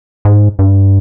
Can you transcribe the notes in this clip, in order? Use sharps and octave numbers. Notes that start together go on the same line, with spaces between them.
G#2
G2